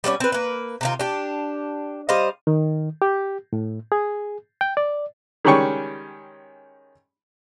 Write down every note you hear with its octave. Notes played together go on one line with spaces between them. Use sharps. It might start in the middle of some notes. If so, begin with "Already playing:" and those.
G3 B3 C#4 D5
C4 B4
A#3 B4
C3 D#3 F4
D4 G4
G3 C5 D#5 F5
D#3
G4
A2
G#4
G5
D5
D#3 G3 G#3 C#4 G5 C#6